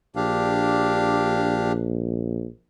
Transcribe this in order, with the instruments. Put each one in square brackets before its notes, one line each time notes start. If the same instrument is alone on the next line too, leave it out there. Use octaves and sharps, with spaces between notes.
[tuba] A#1 [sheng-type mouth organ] D4 G4 F5